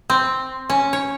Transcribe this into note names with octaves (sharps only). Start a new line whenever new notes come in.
C4
C#4
C#5